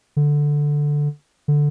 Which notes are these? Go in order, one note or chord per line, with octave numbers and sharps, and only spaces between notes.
D3
D3